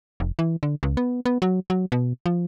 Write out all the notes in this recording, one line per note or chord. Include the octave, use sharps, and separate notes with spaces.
F1
E3
D3
C#2
B3
B3
F#3
F#3
B2
F3